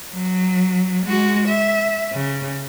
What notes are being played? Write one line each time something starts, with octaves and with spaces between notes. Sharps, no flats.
F#3
G#3 F#4
E5
C#3